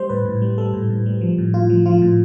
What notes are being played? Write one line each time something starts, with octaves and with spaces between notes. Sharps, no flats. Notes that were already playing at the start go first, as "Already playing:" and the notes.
Already playing: G3 C5
A2 B4
A2
G3
G3 A4
A2
A2
G3
F3
A2
A2 F4
F3
F3 F4
A2